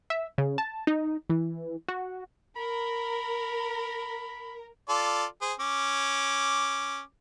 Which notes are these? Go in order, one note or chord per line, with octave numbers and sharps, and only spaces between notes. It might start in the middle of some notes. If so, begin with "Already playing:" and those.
E5
C#3
A5
D#4
E3
F#4
A#4 B5
F4 A4 D5
G#4 C5
C#4 D6